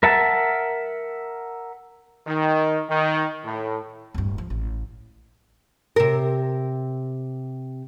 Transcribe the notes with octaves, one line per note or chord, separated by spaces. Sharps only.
A#4 E5 F#5 A5
D#3
D#3
A2
D1 G2
F3
A1
C3 A#4